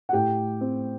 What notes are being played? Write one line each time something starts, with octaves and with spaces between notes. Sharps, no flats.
F#5
A2 G4 G5
C4